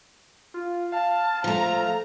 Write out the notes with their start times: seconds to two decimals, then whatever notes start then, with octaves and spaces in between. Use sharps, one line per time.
0.54 F4
0.92 F5 A5
1.44 F3 A3 A#5